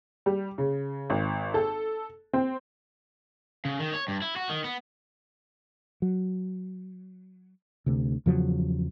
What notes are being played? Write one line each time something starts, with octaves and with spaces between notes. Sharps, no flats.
G3
C#3
G#1
A4
C4
C#3
D#3
C#5
G2
E4
F#4
D#3
B3
F#3
D2 C3
E2 C#3 F3 F#3